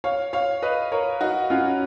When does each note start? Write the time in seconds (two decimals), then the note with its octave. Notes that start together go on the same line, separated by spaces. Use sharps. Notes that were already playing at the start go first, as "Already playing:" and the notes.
0.04 C#5 F5
0.33 C#5 F5
0.62 B4 D#5
0.92 A#4 C#5
1.21 D#4 F#4
1.50 C#4 F4